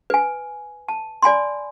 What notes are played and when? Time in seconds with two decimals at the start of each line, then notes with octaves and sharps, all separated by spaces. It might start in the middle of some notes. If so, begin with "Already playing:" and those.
0.10 B4 G#5
0.88 A5
1.22 D5 G#5 B5 C6